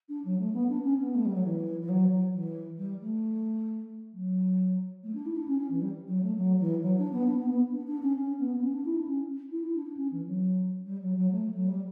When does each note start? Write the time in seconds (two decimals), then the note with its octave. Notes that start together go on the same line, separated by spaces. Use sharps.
0.09 D4
0.25 F#3
0.39 A3
0.54 B3
0.69 D4
0.84 C#4
0.99 B3
1.15 A3
1.25 G3
1.34 F#3
1.44 E3
1.82 E3
1.89 F#3
2.11 F#3
2.34 E3
2.78 G3
3.01 A3
4.13 F#3
5.03 A3
5.15 D4
5.26 E4
5.36 D4
5.48 C#4
5.59 C#4
5.71 E3
5.82 G3
6.08 F#3
6.22 A3
6.37 F#3
6.60 E3
6.83 F#3
6.98 D4
7.13 B3
7.27 D4
7.39 B3
7.50 B3
7.72 D4
7.87 D4
8.03 C#4
8.17 C#4
8.40 B3
8.56 B3
8.62 C#4
8.73 D4
8.85 E4
8.96 D4
9.08 C#4
9.51 E4
9.63 E4
9.75 D4
9.86 D4
9.97 C#4
10.12 E3
10.27 F#3
10.86 G3
11.02 F#3
11.16 F#3
11.31 A3
11.54 F#3
11.67 G3